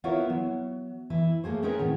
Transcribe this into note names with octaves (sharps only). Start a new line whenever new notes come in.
B3 E4 F4 A#4 B4 C#5
F#3
E3 E4 B4
A3 A#3 G#4 C5
C4 C#4 D#4 G#4 A#4 B4
A2 D#3 B3